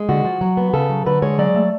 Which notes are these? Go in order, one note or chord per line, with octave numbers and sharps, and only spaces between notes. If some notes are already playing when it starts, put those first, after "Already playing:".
Already playing: G#3
D3 F#4
F3
F#3
B3
C#3 A4
F#3
D3 B4
G#3 C#5
F#3 D5
A3